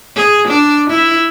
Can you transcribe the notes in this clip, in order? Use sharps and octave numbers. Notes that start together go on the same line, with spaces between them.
G#4
D4
E4